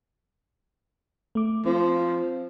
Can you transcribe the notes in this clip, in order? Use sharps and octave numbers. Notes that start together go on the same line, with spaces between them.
A3 D6
F3 C4